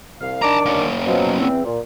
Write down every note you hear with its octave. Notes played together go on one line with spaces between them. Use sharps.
C2 F5
D#3 D4 A5 A#5 D6
A#3 C#4
B2 F3 F#3
E2 E3 C4
A#2